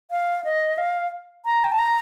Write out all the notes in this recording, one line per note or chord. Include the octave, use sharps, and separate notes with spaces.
F5
D#5
F5
A#5
G5
A5
A#5